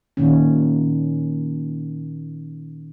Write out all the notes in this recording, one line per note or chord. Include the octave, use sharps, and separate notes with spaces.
A#2 D#3 C#4